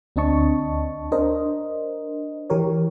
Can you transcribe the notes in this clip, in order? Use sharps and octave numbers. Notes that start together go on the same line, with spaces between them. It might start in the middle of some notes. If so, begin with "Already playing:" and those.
D2 C4 D4 D#5 A5 C#6
D4 A#4 C5 D#5
E3 G4 A#4 C#5